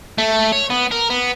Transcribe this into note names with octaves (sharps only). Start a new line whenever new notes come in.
A3
C#5
B3
A#4
B3